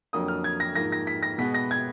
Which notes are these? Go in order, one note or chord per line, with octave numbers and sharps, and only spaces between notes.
F2 D3 F#3 A#3 D#6
F6
G#6
A#6
G#2 F3 A#3 A#6
A#6
B6
A#6
B2 G#3 B3 B6
A#6
G#6